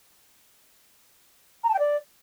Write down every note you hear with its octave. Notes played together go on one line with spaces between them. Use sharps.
A#5
A5
G5
D5